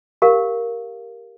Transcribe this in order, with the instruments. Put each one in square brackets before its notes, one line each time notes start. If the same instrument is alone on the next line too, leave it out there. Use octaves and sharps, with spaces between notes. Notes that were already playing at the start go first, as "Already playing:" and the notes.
[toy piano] G4 A#4 F5